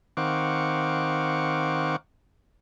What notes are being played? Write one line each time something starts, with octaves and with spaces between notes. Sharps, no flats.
D#3 C4 F5 F#5 C#6 D6